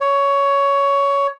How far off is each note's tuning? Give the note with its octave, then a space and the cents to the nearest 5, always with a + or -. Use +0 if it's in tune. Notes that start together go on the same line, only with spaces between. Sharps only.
C#5 +15